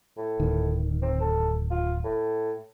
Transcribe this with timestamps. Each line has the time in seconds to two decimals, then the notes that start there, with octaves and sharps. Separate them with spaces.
0.17 A2
0.40 D1 D#3
1.02 C4
1.21 A4
1.71 F4
2.04 A2